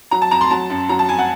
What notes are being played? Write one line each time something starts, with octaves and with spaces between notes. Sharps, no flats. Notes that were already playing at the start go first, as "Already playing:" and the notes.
F#3 A#5
A5
F2 A#5
C6
F#3 A5
F#2
F#3 A#5
A5
F2 G#5
F#5